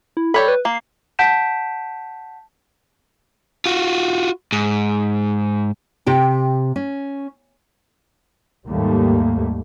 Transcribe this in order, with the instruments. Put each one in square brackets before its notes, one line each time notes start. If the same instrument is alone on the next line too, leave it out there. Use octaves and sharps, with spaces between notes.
[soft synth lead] E4
[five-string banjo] G3 C#5 B5 [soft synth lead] A4
[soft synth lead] B4
[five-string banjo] A#3 [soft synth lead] C7
[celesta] F#5 A5 G6 B6 D7 E7
[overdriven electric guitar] F4 F#4
G#2
[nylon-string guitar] C3 G4 G5
C#4
[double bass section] D#2 G#2 G3 A3 A#3